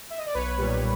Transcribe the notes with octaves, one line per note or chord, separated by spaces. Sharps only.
E5
D#5
D5
B1 B4 C#5
A#2 G3